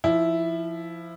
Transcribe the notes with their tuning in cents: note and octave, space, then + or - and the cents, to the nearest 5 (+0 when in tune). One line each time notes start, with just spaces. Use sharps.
F3 -20 E4 +0